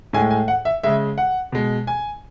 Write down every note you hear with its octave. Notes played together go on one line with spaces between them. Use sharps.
A2 G#3 G#5
G#5
F#5
E5
C#3 G#3 E5
F#5
B2 G#3
G#5